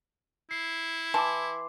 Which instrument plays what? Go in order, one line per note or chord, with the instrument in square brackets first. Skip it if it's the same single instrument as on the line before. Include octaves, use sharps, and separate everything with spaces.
[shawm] E4 [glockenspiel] C7
[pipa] E3 A5 [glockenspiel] C6 D6